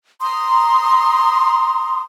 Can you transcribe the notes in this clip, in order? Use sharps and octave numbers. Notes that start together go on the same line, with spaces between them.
A#5 C6 D#6